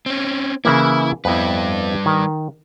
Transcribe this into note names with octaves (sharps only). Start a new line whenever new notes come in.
C4 C#4
C#3 E3 A#3 E4
F2 G3 B3 E4 B4
D#3